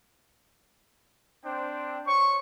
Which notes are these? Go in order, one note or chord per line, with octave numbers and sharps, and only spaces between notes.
C4 D4 C5 G5
C5 C#5 C#6